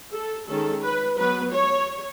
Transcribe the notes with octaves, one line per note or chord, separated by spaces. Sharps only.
A4
D#3 G#3 C#4 A4
B4
F#3 B3 B4
C#5